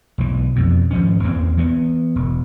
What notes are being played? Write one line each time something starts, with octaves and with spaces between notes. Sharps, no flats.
B1 E3
F2 B2
G#1 F3 C#4
E2 E3 A#3 C4
E3 B3
E1